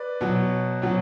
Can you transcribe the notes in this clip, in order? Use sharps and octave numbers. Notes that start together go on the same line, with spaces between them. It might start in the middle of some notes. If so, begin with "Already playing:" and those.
Already playing: B4 D5
B2 F#3
B2 F#3